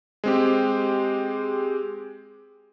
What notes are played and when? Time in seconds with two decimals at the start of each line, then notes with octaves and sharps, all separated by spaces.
0.24 G#3 C4 G4